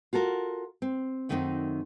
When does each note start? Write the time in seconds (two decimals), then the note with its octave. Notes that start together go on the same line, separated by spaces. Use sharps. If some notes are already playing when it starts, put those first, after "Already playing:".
0.13 F4 F#4 A4 A#4
0.82 C4
1.29 F#2 D#3 A3 C4 C#4 D#4